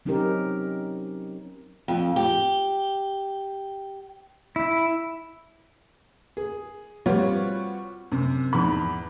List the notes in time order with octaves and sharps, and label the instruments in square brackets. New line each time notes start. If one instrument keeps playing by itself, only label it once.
[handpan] F#3 C4 C#4 D#4 G4 A#4
[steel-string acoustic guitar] F2
G4
[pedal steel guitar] E4
[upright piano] G#4
G3 C4 F4 F#4 B4 C#5
F#2 C3
E2 G#2 B5